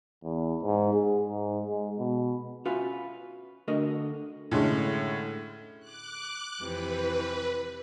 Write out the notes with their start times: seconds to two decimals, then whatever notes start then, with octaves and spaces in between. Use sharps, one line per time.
0.23 E2
0.63 G#2
0.94 G#4
1.29 G#2
1.67 G#3
1.99 B2
2.65 C#4 F4 F#4 B4 E5 F5
3.68 D3 A3 F#4 A#4 D#5
4.51 A2 D3 G#3 C#4
5.80 D6 F#6
6.61 F2 C3 E3 B4